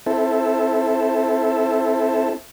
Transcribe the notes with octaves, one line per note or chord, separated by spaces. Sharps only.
C4 E4 A4